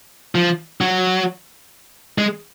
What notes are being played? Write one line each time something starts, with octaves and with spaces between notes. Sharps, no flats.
F3
F#3
G#3